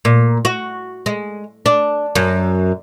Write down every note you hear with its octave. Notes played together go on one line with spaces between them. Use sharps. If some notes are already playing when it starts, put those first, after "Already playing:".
A#2
F#4
G#3
D4
F#2